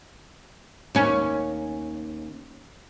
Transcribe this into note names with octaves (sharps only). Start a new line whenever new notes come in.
D#2 C#4